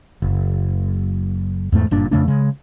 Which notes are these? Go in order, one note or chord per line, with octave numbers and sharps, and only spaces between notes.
F#1
E2 G#2 A3
F#1 G2 A#2 D4
F2 C#3 A3 D4
C#3 G#3